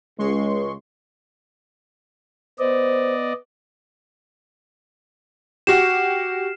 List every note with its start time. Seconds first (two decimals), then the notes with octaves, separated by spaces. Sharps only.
0.19 C#2 G#3 C6 C#6
2.59 B3 C5 D5 D#5
5.67 F#4 G4 F6 C7 E7